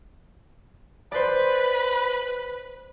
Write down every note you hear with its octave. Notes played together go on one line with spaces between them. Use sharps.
B4 C5 D5